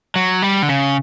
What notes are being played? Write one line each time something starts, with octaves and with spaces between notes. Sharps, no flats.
F#3
G3
D3
C#3